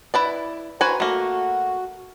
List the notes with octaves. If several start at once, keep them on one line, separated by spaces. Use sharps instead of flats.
E4 B4 D5
F#4 B4 C5 G#5 A#5
A3 A#3 F#4